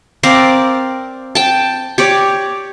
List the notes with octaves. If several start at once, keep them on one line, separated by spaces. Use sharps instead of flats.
C4 A#4 D5 F5
G5 A5
G4 C#5 D5